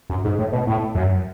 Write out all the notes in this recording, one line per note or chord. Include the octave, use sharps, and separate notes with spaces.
F#2
G#2
A2
B2
A2
F#2